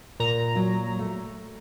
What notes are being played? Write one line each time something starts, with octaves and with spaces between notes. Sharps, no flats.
A#2 A#5
F#3
A3